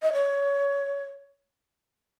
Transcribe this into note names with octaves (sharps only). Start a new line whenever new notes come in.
D#5
C#5